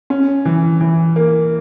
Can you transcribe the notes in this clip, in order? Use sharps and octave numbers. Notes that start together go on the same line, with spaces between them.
C#4
E3
E3
A#3